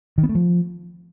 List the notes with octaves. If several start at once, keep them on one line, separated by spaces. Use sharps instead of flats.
D#3
B3
A3
F3